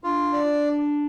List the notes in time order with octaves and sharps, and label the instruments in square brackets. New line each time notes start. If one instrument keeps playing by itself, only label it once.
[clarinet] D4 [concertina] F4
[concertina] D5